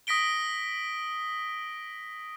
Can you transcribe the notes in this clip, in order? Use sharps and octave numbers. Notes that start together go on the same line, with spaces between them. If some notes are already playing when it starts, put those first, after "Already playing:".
D#6 A#6 B6 D7 G7